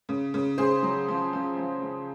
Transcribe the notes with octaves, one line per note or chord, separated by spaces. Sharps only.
C#3
C#3
C#3 G#4 C5
F#3
F3
F3
F3
F3